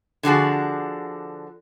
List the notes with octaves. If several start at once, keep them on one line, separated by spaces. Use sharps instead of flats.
D3 F3 F#4 G#4